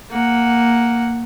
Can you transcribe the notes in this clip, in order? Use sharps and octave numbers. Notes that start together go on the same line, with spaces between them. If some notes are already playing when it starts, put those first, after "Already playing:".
A#3 F#5